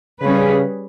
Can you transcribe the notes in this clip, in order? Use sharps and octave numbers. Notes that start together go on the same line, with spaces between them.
C#3 G3 C#4 G#4 B4